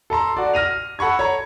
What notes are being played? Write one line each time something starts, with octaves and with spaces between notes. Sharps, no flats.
A4 A5 A#5 C6
F#4 D5
F6 A#6 D#7 F7
A4 F#5 B5 C#6 G#6
C#5 A#5